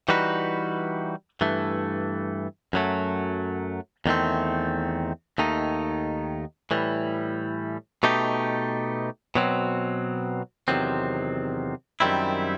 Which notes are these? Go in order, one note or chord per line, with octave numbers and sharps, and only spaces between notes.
E3 G3 D#4 F#4 B4
G2 E3 A3
F#2 F#3 A3
E2 D#3 A3 C4
D#2 D#3 A3 D#4
A2 E3 G3
B2 A3 D#4 G4
B2 F#3 C4
E2 C3 D#3 F#3 C4
F#2 D#3 G3 C4 E4